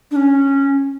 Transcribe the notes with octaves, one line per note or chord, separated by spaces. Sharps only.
D4
C#4